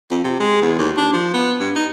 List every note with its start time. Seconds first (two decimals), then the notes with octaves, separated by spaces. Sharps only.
0.10 F2
0.24 C3
0.40 G#3
0.62 E2
0.78 D#2
0.97 D4
1.13 F3
1.33 B3
1.60 G2
1.76 D#4